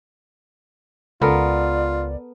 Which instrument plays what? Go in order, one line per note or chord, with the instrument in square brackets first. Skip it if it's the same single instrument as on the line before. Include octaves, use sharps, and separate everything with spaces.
[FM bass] C#2 [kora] B3 A4 A#4 [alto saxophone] F4 [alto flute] D5